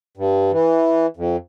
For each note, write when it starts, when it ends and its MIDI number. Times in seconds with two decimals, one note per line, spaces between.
0.17 0.52 43
0.52 1.06 52
1.17 1.37 41